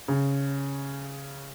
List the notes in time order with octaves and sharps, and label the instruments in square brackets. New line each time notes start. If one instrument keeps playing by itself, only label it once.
[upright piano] C#3